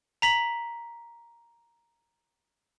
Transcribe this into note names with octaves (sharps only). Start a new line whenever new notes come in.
A#5 B6 F#7